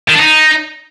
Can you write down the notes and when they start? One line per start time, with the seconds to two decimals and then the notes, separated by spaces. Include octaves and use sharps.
0.09 D#3
0.15 D4
0.20 D#4